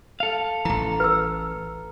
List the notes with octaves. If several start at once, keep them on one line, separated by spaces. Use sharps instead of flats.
A4 F5
A1 E3 A#5
B4 E6